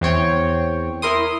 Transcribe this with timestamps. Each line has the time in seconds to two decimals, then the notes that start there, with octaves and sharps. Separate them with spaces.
0.01 E2 C4 C#5 G5
1.02 E4 A#4 C6 D#6